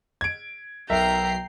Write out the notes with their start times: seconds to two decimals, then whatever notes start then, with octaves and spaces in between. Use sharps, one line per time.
0.21 G#6 D7
0.90 B1 A#4 E5 G5 A#5 C7